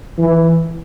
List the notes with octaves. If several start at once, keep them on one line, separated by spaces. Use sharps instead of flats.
E3